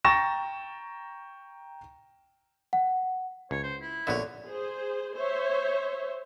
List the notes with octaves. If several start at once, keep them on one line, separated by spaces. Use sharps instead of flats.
G5 A#5 C#6 A6 A#6 E7
F#5
C#2 C#5
C5
E4
A#1 D3 B3 C#5 E5
G#4 C5
C5 C#5 E5